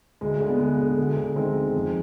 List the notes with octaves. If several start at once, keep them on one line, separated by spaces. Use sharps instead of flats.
D2 G#3
D3
B3
D3 G#3
D3
D2
D2
D#3 G#3 C4
D#3
F2